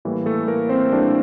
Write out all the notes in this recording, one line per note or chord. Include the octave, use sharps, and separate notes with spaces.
A2 E3 G3 A#3
A3 A4
A#3 A#4
C4 C5
A2 E3 G3 A#3 D4